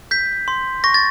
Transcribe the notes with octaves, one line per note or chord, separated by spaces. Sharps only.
G6 B6
C6
C#6 A#6
A6